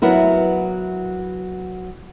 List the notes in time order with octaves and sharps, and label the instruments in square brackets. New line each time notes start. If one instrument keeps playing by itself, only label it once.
[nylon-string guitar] F#3 B3 E4 A#4